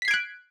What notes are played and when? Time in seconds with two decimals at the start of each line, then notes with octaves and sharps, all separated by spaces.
0.02 B6
0.05 C7
0.08 G#6
0.11 D7
0.14 F#6